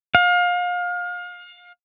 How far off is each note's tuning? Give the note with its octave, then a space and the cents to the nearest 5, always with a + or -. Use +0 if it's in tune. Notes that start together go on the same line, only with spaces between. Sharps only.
F5 +30